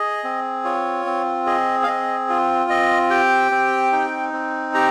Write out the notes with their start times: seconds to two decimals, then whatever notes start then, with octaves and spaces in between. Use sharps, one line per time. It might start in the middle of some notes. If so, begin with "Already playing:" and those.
Already playing: G#4 D#5
0.24 C4
0.64 F4 C#5
1.06 C4
1.46 G#4 D#5
1.84 F5
1.87 C4 D#5
2.29 F4
2.70 C4 D#5
3.10 G4 G5
3.51 C4
3.92 D#4
4.33 C4
4.74 G4 A#5